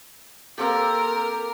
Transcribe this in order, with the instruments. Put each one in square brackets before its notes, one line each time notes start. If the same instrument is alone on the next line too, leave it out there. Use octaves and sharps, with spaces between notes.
[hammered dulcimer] A#3 C4 G4 [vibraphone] A4 [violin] A#4